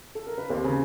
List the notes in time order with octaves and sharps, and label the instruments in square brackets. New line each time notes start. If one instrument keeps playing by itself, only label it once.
[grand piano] A4
A#4
B4
[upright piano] D#2 [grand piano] C4 C5
[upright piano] C#3